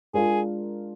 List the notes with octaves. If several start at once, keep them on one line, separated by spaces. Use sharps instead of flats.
G#3 D4 F4 G#4 A#4